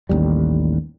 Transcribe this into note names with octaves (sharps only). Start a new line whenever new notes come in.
A1 D#2 G#2 G3